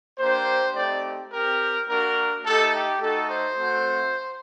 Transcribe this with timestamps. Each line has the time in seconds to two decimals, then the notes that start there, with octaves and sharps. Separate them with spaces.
0.18 A#3 D4 G4 C5
0.75 A3 C4 D#4 G4 D5
1.31 C4 G4 A#4
1.89 A#3 D4 F#4 A#4
2.45 A3 D#4 G4 A4
2.74 G4
3.01 A3 D#4 F#4 A4
3.29 C5
3.58 A3 C4 F#4